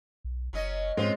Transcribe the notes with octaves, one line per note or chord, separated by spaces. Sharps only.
B1
F#1 F#3 C#4 D#5
G#2 G#3 C4 C#4 F4 G4